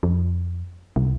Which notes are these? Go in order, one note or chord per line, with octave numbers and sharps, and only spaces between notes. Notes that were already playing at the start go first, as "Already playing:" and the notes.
F2
C2